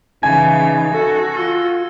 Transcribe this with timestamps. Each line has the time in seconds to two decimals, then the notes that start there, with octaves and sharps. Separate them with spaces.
0.23 C#3 E3 D#4 G#5 G#6
0.94 F#4 A4
1.37 F4 E6